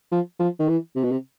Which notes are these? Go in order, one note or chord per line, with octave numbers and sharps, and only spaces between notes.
F3
F3
D#3
E3
C3
B2
C3